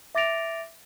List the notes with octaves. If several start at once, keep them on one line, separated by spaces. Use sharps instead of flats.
E5 D6 A6 A#6 D7 F7